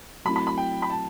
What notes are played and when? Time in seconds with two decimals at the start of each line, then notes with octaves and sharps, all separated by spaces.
0.25 F#3 A3 C4 E4 B5
0.36 B5
0.47 B5
0.58 G5
0.82 B5
0.90 A5